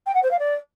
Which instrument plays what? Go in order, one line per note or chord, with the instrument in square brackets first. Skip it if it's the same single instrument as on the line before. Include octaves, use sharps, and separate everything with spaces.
[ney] G5
F#5
C5
F5
D5